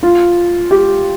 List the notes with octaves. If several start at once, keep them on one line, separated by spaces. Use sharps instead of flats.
F4
G4